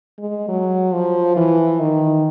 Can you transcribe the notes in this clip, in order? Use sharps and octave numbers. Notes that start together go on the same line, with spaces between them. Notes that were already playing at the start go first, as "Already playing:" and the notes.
G#3
F#3
F3
E3
D#3